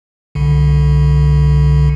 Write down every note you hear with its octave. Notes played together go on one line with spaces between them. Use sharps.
C2 D3